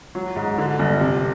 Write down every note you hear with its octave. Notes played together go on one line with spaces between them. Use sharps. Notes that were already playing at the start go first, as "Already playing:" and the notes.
F#3
G#2
D3
G1
C3